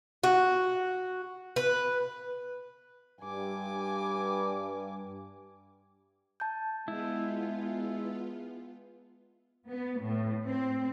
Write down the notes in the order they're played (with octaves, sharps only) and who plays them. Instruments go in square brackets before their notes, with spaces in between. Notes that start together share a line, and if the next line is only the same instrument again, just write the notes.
[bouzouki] F#4
B4
[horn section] G2 [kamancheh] G#5 D6
[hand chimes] A5 G6
[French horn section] G#3 [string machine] B3 F4 [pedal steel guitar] E4
[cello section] B3
A2
C4